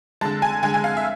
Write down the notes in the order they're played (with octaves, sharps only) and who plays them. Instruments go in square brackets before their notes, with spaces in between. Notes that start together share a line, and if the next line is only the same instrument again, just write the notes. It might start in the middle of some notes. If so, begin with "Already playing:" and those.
[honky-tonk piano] D3 G#3 A5
G#5
D3 G#3 G#5
G#5
F5
E5